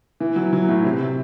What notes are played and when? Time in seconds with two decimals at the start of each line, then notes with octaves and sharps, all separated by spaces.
0.20 E3
0.36 F#3
0.53 F#3
0.68 A2
0.84 C3
1.00 C3